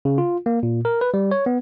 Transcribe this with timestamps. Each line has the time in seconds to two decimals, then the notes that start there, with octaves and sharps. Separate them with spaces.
0.05 C#3
0.18 F4
0.46 A#3
0.63 A#2
0.85 A#4
1.01 B4
1.14 G3
1.31 C#5
1.46 B3